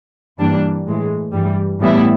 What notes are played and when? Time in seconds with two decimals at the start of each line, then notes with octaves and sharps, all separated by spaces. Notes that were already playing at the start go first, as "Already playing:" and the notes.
0.39 G2 E3 G3 A#3 D4
0.87 A2 E3 G#3
1.33 G2 E3 G3
1.80 A2 E3 G3 B3 E4